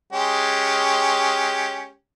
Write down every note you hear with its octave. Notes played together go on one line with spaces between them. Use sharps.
G#3 C#4 G4